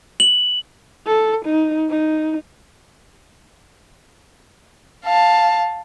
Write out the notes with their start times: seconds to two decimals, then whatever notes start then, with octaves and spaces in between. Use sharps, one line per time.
0.20 F#7
1.07 A4
1.45 D#4
1.90 D#4
5.05 F5 A5